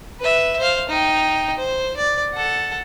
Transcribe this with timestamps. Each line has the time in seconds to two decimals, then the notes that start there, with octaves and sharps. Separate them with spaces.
0.20 B4 E5
0.59 C5 F5
0.89 D#4 G5
1.58 C5
1.97 D5
2.33 A4 F#5